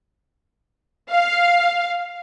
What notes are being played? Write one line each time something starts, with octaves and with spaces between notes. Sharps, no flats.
F5